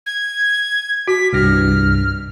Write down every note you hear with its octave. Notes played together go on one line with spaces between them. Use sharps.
G#6
F#4 B6
C2 G2 F6 A#6